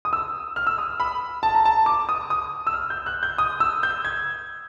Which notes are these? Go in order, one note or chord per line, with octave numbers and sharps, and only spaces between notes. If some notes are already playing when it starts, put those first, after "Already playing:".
D#6
E6
F6
E6
D#6
B5
A5
A#5
A5
D6
D#6
D#6
E6
F6
G6
F#6
G6
D#6
E6
G6
G#6